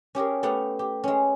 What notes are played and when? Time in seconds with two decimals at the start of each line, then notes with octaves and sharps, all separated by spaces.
0.15 C#4 G4 G#4 A#4
0.43 A3 B3 G4 F5 F#5
0.79 G4
1.04 G#3 C#4